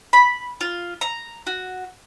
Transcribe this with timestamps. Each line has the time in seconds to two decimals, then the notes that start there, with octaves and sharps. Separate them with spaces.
0.13 B5
0.61 F4
1.01 A#5
1.47 F#4